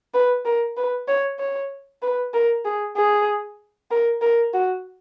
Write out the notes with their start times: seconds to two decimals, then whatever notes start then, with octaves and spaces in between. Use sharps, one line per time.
0.14 B4
0.45 A#4
0.77 B4
1.08 C#5
1.39 C#5
2.02 B4
2.34 A#4
2.65 G#4
2.97 G#4
3.91 A#4
4.22 A#4
4.54 F#4